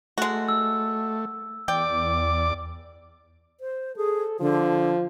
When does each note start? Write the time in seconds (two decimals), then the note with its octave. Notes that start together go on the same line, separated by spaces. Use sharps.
0.18 G#3 A3 F#4
0.48 E6
1.68 E2 D5 G5 D6
3.60 C5
3.96 G#4 A4
4.40 D3 F3